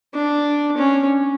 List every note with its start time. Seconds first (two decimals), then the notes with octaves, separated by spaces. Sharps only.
0.14 D4
0.77 C#4